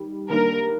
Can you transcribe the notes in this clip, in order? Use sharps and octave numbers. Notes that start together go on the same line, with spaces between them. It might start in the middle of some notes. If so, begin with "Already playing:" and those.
Already playing: D#3 G3
D#3 G3 A#3 D4 A#4